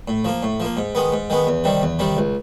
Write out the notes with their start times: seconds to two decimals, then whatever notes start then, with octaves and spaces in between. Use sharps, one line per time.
0.08 A2
0.25 F3 A#3
0.43 A2
0.60 F3 A#3
0.77 G#2
0.95 D#3 G#3 B3
1.12 G#2
1.30 D#3 G#3 B3
1.47 E2
1.64 C3 D#3 G3
1.82 E2
1.99 C3 D#3 G3
2.17 C#2